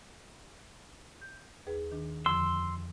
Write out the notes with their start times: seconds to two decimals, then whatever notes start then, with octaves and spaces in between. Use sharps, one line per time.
1.21 G6
1.67 D#2 G#4 B4
1.91 D#3 D4
2.26 F2 D3 F3 C6 E6